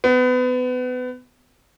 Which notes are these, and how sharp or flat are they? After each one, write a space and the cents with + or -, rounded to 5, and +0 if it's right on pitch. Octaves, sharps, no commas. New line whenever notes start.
B3 +30